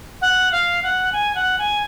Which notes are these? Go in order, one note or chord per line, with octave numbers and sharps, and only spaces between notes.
F#5
F5
F#5
G#5
F#5
G#5